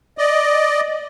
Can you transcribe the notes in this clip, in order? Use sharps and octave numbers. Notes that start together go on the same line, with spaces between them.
D5 D#5